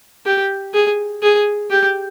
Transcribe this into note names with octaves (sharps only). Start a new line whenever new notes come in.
G4
G#4
G#4
G4